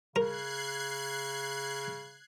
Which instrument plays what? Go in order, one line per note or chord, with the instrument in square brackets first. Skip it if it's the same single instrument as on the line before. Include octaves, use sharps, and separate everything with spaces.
[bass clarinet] C#3 [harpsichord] A#4 [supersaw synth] F#6 G#6 C7